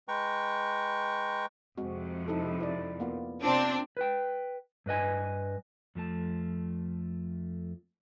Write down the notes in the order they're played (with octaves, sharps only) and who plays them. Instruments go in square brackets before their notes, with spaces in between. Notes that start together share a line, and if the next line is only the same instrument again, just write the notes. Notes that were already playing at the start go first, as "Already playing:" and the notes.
[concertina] G#3 B4 G5 A#5 C#6
[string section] F2 C3 [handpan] G#3 C4 F#4
[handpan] D#4 E4 A4
E4 D5
A#3 B3 F4
[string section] C3 C4 D4 [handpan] F4 D5
[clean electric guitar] B4 G5
G2 B4 D#5 G#5
[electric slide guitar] F2 F3 A3 A5